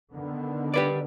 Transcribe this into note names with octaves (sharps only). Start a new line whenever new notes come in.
D3 D#3 B3
G4 B4 D5